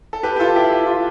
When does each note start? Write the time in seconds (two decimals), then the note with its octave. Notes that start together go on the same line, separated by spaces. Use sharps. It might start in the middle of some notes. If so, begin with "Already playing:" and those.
0.13 A4
0.23 G4 B4
0.36 G4
0.39 F4 A4
0.56 E4 G4
0.72 G4
0.86 F4